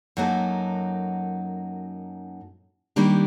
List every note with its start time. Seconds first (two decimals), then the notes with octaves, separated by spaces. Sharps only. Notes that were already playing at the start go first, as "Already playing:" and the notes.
0.17 F#2 F#3 A#3 D#4 A4
2.96 D#3 G3 A#3 D4 G4